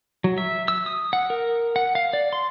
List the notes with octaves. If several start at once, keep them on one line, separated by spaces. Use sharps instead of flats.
F#3
E5
E6
D#6
F#5
A#4
F#5
F5
D5
C6